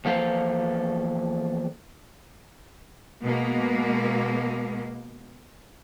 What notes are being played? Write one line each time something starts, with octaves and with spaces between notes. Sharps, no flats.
E2 F3 A#3 A4 C5 F5
B2 G#3 A#3